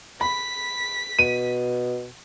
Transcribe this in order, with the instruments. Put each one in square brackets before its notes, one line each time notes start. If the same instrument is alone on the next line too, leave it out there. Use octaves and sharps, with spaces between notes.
[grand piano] B5 [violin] B6
[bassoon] B2 [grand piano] D#7